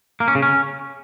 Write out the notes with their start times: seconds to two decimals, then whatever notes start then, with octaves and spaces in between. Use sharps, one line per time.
0.20 A#3
0.28 C#4
0.35 C#3
0.42 C#4